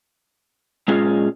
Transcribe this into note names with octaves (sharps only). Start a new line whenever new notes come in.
A#2 G#3 C#4 F4 G#4